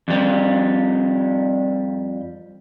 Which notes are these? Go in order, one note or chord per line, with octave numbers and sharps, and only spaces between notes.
F2 G3